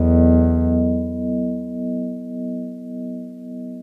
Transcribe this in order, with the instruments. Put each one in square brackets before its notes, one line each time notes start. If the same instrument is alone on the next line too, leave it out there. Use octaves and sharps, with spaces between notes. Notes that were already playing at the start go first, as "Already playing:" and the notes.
Already playing: [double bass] E2 [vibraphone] F#3 B3 E4 A4 D#5